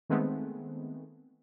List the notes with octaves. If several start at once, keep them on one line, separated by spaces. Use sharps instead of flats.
D#3 G#3 A3 B3 C4